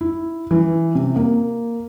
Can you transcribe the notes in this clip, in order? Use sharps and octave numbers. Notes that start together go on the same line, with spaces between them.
E4
E3
C3
A#3